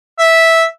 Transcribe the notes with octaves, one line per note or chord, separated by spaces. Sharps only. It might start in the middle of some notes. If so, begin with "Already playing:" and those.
E5